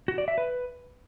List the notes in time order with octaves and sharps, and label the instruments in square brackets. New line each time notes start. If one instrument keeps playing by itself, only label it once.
[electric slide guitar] F#4
D5
E5
B4